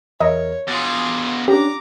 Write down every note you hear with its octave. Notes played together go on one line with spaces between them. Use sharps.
E2 A#4 C#5 D#5 E5 A#5
B2 F4 G#4 D6 A6
C#4 D4 G4 A#5 D6